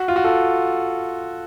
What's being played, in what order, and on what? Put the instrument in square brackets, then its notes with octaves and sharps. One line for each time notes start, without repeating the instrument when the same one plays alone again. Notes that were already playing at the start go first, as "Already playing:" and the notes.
Already playing: [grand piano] F#4
F4
F#4
F4 A4